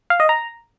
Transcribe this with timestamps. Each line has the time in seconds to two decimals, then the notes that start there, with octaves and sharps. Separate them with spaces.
0.10 F5
0.20 D#5
0.29 A#5